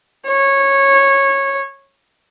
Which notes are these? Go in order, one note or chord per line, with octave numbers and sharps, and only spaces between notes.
C#5